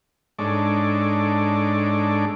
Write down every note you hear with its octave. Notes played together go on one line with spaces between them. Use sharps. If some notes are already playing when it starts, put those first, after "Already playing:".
G#2 G#3 D4 A4 C#5 D6